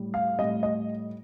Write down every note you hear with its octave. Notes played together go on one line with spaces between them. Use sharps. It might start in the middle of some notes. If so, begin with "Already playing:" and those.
Already playing: A2 G3
F5
A2 G3 D#5
D#5